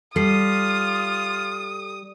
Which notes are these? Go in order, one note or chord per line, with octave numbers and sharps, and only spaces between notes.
G3 F4 A4 D#6 C7